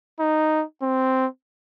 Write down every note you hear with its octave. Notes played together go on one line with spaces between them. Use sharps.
D#4
C4